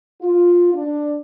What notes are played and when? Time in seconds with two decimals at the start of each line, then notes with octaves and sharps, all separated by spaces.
0.22 F4
0.75 D4